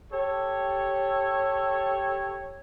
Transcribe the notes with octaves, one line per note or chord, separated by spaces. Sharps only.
G4 A4 C#5